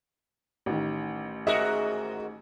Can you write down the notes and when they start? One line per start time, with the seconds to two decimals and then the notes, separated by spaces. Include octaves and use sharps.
0.66 A1 D#3
1.47 G#2 F#4 G#4 A#4 D#5 E5